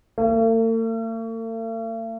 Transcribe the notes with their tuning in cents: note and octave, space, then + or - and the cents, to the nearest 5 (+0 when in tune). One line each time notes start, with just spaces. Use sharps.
A3 +45